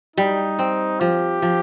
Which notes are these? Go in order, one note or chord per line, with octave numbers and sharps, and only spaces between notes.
G3 D#4
C4
F3 G4
F3